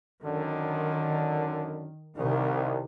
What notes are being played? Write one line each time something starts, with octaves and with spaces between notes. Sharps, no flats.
F#2 D3 D#3
C2 C3 D#3